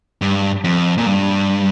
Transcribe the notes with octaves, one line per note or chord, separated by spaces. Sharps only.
G2
F2
A#2
G2